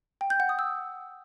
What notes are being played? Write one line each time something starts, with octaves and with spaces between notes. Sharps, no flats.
G5
G6
F#5
D#6
E6